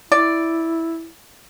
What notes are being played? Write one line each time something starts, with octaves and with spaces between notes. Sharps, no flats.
E4 D5